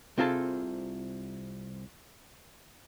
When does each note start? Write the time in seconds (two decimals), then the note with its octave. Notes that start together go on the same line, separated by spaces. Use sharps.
0.18 C2 C4 F4 G#4 A4 A5